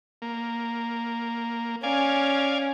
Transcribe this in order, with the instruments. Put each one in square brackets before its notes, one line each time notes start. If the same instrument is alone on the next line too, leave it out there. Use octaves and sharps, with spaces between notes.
[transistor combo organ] A#3
[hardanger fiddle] C#4 [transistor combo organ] D5 F5 G#5